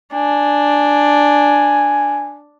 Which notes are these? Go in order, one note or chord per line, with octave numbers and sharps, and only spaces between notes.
D4 G#5